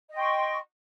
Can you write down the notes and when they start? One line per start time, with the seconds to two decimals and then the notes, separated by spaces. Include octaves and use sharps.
0.10 D#5
0.13 G5
0.16 C6
0.19 C#6